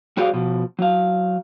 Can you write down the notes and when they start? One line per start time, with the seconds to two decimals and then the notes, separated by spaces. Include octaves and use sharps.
0.17 G3 F#4 G#4 C5 D5 F5
0.34 B2 F3
0.79 F#3 F5